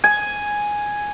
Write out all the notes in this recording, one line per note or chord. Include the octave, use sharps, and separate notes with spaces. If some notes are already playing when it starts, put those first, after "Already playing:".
G#5